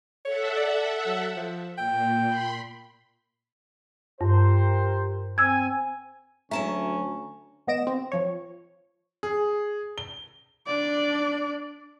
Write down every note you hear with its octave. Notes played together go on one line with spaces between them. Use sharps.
A4 C#5 E5 F#5
D5
F#3
F3
A#2 G5
B5 C6
G2 G4 A#4 C5
C4 G#5 E6 G#6
D2 F#3 C#4 E5 A5 A#5
A1 B3 D#5 A#6 D7 E7
C4
F3 C#5
G#4
G7
D4 D5